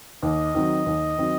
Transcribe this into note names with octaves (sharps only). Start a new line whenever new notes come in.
D#2 D#5
D#3 F#3 C4 F#4
D#2
D#3 F#3 C4 F#4